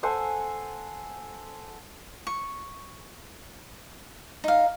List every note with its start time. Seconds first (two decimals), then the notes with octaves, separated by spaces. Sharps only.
0.03 A4 C5 F#5 G#5
2.27 C#6
4.44 D#4 F5